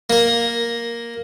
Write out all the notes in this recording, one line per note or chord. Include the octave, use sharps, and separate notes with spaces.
A#3 A#4